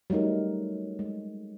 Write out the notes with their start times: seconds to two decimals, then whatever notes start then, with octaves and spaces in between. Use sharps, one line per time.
0.10 F#3 G3 A3 D#4 A#4
0.99 G#3